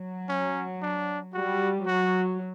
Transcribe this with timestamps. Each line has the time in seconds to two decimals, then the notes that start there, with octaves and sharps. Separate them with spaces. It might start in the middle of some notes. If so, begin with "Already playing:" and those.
Already playing: F#3
0.29 C#4
0.82 D4
1.34 G3 F#4
1.87 F#3 F#4